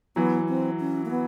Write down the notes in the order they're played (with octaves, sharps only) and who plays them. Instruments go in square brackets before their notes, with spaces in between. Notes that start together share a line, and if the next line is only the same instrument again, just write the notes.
[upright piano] E3 F#3 [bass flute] B3
[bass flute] C4
C#4
A#3
B3